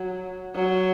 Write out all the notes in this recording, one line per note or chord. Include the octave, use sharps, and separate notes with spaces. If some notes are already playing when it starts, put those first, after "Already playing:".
Already playing: F#3
F#3